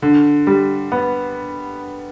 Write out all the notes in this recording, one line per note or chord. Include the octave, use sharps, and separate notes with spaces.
D3
G3
B3